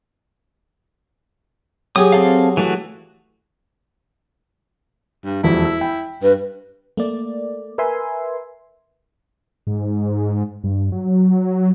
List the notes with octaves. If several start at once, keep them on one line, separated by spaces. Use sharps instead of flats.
F#3 G4 G#4 D#6
C4 A4 F5
E3 A3 F#4
G2
E1 F2 E4 F4
E6
G5 B5
G2 B4
A3 A#3 D5
A#4 B4 E5 G#5 C6
G#2
G2
F#3